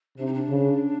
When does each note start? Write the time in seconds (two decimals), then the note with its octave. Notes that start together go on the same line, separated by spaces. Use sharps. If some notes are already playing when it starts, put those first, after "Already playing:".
0.18 C3 D4
0.26 D#4
0.33 D4
0.48 C#3